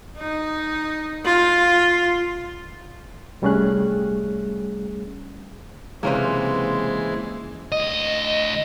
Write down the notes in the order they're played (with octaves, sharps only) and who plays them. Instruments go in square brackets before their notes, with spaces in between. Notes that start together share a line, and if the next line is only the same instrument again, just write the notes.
[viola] D#4
F4
[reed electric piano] C2 G3 A3 C#4 G#4 F#6
[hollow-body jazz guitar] C#2 C3 [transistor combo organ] E3 G#3 [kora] A#3 C#4 B4 [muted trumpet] C5
[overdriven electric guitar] D2 D#5